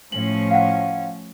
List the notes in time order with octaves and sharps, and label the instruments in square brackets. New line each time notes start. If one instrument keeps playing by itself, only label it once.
[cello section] A2 F3 C#4 [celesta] F#7
[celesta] F5 F#5